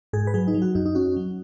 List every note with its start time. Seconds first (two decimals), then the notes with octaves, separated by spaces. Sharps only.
0.13 G#2 G#4
0.27 B4
0.34 F#3 G#4
0.48 D#4
0.54 F#3
0.62 F#4
0.75 F#2 D#4
0.86 D#4
0.95 C#4 F#4
1.17 F#3